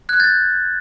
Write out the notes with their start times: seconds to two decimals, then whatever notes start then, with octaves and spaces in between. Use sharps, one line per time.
0.09 F#6 G#6
0.20 G6 A6